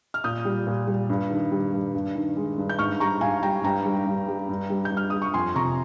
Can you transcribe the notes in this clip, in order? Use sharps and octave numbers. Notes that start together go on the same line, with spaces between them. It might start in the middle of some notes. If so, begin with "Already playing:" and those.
F6
A#2 D#6 G6
G3
A#2
G3
G2
D#3
G3
G2
G2
D#3
G#3
G2
G6
G#2 C#6 F6
G3 A#5 C#6
G#2 F5 G#5
G3 G5 A#5
G2 G5 A#5
G3
G2
G3
G2
G3
G6
G2
F6
G3 D#6
C#6
F2 G#5 C6
C3 A#5 C#6